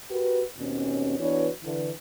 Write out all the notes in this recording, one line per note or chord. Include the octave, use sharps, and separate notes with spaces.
F#4 G4 A#4 B4
D#2 B2 C4 C#4
E3 B3 D4 F#4 B4 C#5
D3 E3